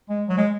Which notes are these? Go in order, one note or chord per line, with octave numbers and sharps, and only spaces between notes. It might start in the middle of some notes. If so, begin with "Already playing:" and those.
G#3
F#3
G#3